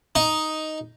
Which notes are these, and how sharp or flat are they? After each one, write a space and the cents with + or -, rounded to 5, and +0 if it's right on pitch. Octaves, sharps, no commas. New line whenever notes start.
D#4 +5